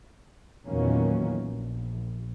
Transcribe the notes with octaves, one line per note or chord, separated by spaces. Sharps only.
E2 A#2 D#3 F#3 A#3 C#4
A#1